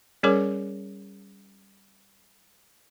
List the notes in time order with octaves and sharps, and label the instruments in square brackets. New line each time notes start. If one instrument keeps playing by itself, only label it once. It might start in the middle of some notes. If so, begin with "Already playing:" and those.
[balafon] G3 C#4 G#4 A#4 C#5 D6